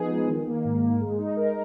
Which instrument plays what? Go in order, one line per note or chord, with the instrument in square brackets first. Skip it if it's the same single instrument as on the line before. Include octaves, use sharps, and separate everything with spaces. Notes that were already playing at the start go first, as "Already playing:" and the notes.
Already playing: [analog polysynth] F3 B3 D#4 G#4
G#3
D#3
A#3
G#2
G#2
G#3
D#4
A#4